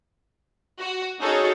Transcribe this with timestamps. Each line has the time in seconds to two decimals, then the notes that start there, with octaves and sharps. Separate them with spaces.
0.80 F#4
1.21 C#4 D#4 F#4 G#4 A4 C#5